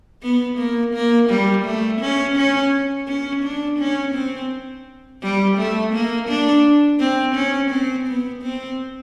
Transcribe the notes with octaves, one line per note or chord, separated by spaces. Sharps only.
B3
A#3
A#3
G3
A3
C#4
C#4
C#4
D4
C#4
C4
G3
A3
A#3
D4
C4
C#4
C4
B3
C4